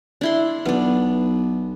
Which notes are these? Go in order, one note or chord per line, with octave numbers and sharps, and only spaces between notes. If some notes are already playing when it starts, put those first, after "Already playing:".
D4 E4 C6
B1 B3 D4